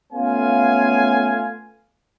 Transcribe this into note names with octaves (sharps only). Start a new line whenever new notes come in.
A3 B3 C#4 F4 F5 G#5